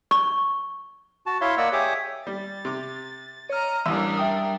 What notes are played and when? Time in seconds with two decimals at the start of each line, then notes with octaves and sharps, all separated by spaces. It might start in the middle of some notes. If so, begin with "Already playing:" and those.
0.11 C#6
1.26 F#4 A5
1.41 E4 C#5 E5 F5 C6
1.57 A#3 D5 D#5 F#5 E6
1.73 G4 G#4 C#5 E5 D6 D#6
2.27 G3 A6
2.65 C3 D6
3.49 C#5 D#5 A#5 F6
3.86 A1 E3 G3 D4 A#4 D#6 E6
4.17 E5 G5 D#6